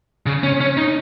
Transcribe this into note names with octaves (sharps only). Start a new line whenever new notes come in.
C#3
C#4
C#4
D#4